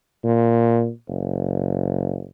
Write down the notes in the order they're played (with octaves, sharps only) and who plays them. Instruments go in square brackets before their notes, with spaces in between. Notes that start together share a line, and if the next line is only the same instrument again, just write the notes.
[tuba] A#2
F#1